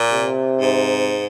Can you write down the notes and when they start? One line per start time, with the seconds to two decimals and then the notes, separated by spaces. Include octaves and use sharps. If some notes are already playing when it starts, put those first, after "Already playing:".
Already playing: A#2
0.12 C3
0.60 G#2